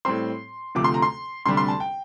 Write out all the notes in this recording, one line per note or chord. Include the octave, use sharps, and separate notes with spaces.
A2 G3 C4 C6
D2 C3 F3 A3 D6
C6
A#5
C6
D2 C3 G3 D4 C6
C6
A5
G5